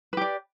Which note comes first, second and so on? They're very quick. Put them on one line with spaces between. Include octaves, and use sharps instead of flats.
B4 G4 D5